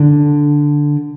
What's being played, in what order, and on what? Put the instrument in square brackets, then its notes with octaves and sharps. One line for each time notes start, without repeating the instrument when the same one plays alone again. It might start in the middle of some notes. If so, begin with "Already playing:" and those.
Already playing: [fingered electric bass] D3